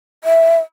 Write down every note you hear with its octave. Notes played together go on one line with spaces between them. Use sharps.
E5